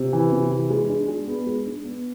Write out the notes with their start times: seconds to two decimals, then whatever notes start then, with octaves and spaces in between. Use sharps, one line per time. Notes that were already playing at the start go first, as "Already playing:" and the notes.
Already playing: C3
0.13 E3
0.32 C3
0.51 E3
0.70 G#3
0.89 D4
1.08 G#3
1.27 B3
1.47 G#3
1.66 D4
1.85 B3